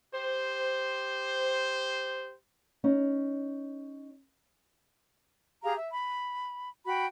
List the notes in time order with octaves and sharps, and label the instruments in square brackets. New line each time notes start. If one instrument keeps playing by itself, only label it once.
[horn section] G4 C5
[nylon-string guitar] C#4 D#4
[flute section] G4 G#4 F5 A#5
E5
B5
F#4 G5 B5